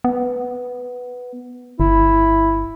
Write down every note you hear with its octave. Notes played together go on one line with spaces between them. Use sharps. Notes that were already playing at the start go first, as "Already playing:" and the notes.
B3
G1 E4